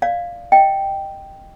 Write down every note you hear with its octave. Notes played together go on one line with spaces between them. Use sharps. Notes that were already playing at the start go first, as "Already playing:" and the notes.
D5 F5
D#5 G5